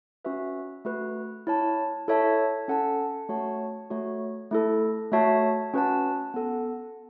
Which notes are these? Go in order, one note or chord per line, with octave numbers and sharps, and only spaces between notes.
C#4 F#4 B4 E5
A3 F#4 B4
E4 C#5 A5
E4 A4 C#5 E5 A5
C#4 A4 F#5 A5
A3 F#4 C#5 F#5 A5
A3 F#4 C#5
A3 E4 A4
A3 F#4 C#5 E5 A5
C#4 F#4 B4 F#5 A5
B3 A4 F#5 A5